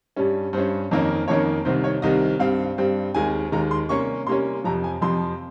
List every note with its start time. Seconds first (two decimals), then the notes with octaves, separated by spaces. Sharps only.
0.16 G2 G3 C#4
0.53 G2 G3 C#4 C5
0.91 F2 D#3 A#3 C#4
1.28 F2 D#3 A#3 C#4 C#5
1.65 C2 C3 D#3 G3 C4 C5
1.84 C#5
2.02 C2 C3 D#3 G3 C4 D#5
2.40 G2 G3 C4 F5
2.78 G2 G3 C4
3.15 D#2 D#3 G#3 G#5
3.52 D#2 D#3 G#3 A#5
3.71 C6
3.89 C3 G3 A#3 C#4 C#6
4.27 C3 G3 A#3 C#4 C6
4.64 F2 C3 F3 A#5
4.84 G#5
5.01 F2 C3 F3 C6